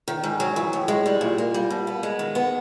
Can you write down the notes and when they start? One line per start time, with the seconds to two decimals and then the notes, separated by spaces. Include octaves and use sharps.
0.08 D#3
0.24 G#2
0.40 F#3
0.56 E3
0.73 A2
0.88 G#3
1.06 G3
1.21 A#2
1.38 A#3
1.54 G3
1.70 B2
1.87 B3
2.03 G#3
2.19 D#3
2.35 B3